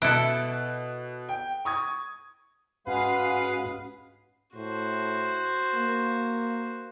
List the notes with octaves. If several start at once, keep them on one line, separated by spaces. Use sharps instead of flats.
B2 E4 A4 F#6 D7
G5
C#6 D#6 G#6
G#2 G#3 C#4 F#4 G#4 B4 F5 F#5
A2 F#4 C5
A#3